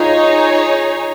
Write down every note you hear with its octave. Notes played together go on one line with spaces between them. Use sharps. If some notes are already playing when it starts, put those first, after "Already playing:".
Already playing: D#4 F4 G#4 C#5